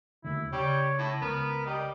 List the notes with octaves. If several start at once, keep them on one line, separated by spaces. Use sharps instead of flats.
D#2 D3 E4
C#3 G3 C#5
A2
C#2 B3 A#4
G3 D#5